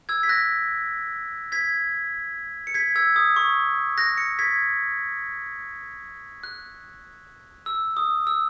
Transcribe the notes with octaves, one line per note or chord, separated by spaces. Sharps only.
E6 G#6
B6
F#6 A#6
G#6 B6
C#7
G#6 B6
E6 G#6
D#6
C#6
F#6 A#6
A#6 C#7
G#6 B6
F#6
E6
D#6
E6